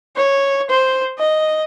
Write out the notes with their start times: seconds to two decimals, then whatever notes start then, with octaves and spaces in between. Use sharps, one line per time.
0.16 C#5
0.70 C5
1.19 D#5